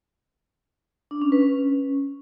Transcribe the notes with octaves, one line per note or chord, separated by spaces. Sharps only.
D4
C#4
B4
C#4